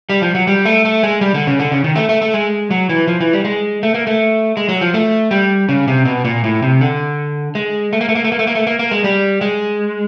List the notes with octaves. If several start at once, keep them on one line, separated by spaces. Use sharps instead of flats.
G3
F3
F#3
G3
A3
A3
G#3
G3
D3
C#3
D3
C#3
D#3
A3
A3
A3
G#3
F#3
E3
F3
E3
G3
G#3
A3
A#3
A3
G#3
F#3
F3
A3
G3
C#3
C3
B2
A#2
A2
C3
D3
G#3
A3
A#3
A3
A#3
A3
A#3
A3
A#3
A3
A#3
A#3
G#3
G3
G#3